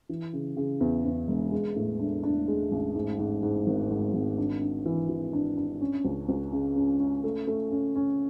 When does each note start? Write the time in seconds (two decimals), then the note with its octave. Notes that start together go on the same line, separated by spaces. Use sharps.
0.09 E3
0.33 C#3
0.57 C#3
0.81 E2
1.05 E2
1.28 E1
1.52 G#3
1.76 A2
1.99 D4
2.23 D4
2.48 G#3
2.71 A1
2.95 G#2
3.19 G#2
3.43 G#2
3.67 G#1
3.91 G#2
4.14 G#1
4.38 D4
4.62 D4
4.86 E3
5.09 E3
5.33 D4
5.57 D4
5.81 C#4
6.05 C#2
6.29 C#2
6.53 C#3
6.76 C#4
7.00 C#4
7.24 A3
7.47 A3
7.71 C#4
7.95 C#4